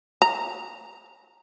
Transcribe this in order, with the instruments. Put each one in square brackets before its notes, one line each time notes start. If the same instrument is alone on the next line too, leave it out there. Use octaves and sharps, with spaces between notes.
[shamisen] A#5